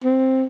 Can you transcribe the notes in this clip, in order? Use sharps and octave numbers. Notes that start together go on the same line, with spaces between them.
C4